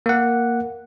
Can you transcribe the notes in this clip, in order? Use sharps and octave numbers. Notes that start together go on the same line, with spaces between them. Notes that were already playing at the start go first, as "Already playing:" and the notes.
A#3 F#5